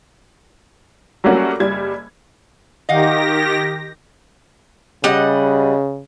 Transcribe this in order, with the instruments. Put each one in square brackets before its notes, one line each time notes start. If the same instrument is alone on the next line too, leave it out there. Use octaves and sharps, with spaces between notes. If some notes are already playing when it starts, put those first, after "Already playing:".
[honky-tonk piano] F#3 G3 A3 A#3 C#4 F#4
F#1 G3 G#6
[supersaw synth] D#3 G4 A#6 [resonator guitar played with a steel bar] D#5 F5 F#5
[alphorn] C#3 [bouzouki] G3 D#5 F#5